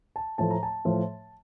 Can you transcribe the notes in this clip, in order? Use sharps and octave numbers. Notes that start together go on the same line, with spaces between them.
A5
A2 F3 A3 A5
A#5
A5
A2 F3 A3